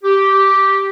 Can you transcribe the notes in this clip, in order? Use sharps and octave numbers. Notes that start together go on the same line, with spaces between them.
G4